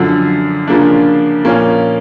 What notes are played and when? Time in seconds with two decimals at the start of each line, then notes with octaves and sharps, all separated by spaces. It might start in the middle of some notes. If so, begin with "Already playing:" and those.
Already playing: F#2 D3 F3
0.67 C#3 F3 A#3 D4
1.45 A#2 F3 A#3 C#4